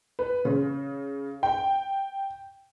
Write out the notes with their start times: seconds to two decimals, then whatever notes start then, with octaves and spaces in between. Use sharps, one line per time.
0.19 B4
0.45 C#3
1.43 G5